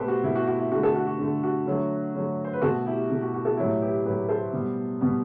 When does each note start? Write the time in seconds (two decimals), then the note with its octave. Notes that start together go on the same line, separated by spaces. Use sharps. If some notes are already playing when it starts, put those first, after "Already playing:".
Already playing: B2 A3 G4 A4 B4 C5
0.08 F#4
0.23 B2 A3 E4
0.35 F#4
0.47 F#4
0.59 E4
0.72 D3 A3 F#4
0.83 F#4 A4
0.95 F#4
1.07 F#4
1.19 D3 A3
1.43 F#4
1.66 D3 F#3 A3
2.15 D3 F#3 A3
2.44 C5
2.53 B4
2.62 B2 A3 F#4 A4
2.86 E4 G4
3.10 B2 A3
3.22 F#4
3.34 F#4
3.45 F#4 A4
3.57 A2 F#3 A3 E4 G4
3.81 G4 B4
4.05 A2 F#3 A3 G4 B4
4.29 A4 C5
4.53 B2 G3 B3
5.01 B2 G3 B3